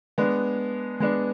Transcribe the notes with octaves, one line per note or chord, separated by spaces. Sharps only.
G#3 B3 D4
G#3 B3 D4